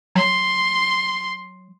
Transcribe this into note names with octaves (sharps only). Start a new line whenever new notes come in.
F#3 C6